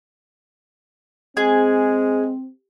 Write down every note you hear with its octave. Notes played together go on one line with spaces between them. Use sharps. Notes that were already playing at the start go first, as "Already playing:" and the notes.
G#3 C4 G#4